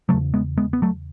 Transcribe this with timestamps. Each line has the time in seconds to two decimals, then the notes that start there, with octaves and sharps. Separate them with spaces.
0.09 C#3 F#3 A3
0.13 E2
0.34 G#3 B3
0.57 G#3 B3
0.73 B3
0.82 F#3 A3